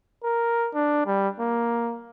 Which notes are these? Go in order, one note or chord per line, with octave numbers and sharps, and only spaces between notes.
A#4
D4
G3
A#3